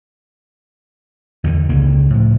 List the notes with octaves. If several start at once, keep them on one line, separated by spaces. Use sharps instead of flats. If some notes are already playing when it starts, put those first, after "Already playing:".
E2 D3 D#3
C#2 C#3 A#3
A2 F3